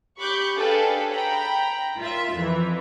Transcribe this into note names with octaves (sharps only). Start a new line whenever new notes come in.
G4 B5 C#6 D6 F#6 G6
D4 G#4 A4 B4 F5 G5
G5 A#5 B5
F4 A#4 E5
F2 E3